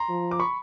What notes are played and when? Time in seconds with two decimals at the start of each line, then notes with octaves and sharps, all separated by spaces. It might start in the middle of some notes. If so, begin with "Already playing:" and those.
Already playing: A#5 C6
0.09 F3
0.31 D6
0.40 B5 C#6